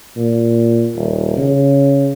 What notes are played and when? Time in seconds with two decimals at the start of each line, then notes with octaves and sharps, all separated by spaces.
0.16 A#2
0.95 D#1
1.37 C#3